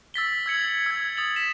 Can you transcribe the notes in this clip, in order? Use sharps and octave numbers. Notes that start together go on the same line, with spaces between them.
E6 A6 B6 G7
E6 G#6 C#7 F#7
E6 G#6
D#6 A6 F#7
B6 E7